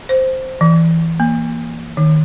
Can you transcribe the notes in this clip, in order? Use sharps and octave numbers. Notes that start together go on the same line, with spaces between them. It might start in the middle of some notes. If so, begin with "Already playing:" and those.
C5
E3
A#3
D#3